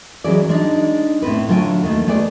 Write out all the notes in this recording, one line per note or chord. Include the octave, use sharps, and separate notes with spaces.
E3 F#3 G#3 C#4 G#4 D5
G#3 D4 D#4
A2 B3 C4 B4
D3 F#3 A3 F4 G5
D#2 D#3 A3
G#3 A3 B3 G#4 B4 D5